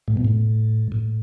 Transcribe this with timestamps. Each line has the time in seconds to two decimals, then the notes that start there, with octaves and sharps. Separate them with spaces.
0.08 A2
0.17 B2
0.25 A2
0.92 A2